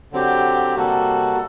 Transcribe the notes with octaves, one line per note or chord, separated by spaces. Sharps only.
D3 F#3 C4 G4
C3 G3 A#3 F#4 A4